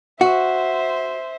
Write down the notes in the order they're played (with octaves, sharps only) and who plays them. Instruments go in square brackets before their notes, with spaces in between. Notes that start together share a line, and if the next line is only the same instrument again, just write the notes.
[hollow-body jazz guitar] F#4 [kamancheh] C5 E5